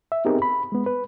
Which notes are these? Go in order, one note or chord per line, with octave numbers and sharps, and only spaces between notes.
E5
B3 C4 D#4 G4 G#4 A#4
B5
G#3 B3
B4